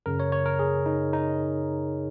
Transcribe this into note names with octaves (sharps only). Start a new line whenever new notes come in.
F#2 C#3 A#4
C#5
C#5
A#4
G#4
D#4
D#4